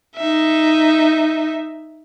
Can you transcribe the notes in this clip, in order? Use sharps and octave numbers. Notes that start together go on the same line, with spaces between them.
D#4 E5